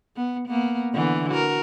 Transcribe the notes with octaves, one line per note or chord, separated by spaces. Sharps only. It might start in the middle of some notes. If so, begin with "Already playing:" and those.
B3
A#3 B3
D3 E3 B3
F#4 A#4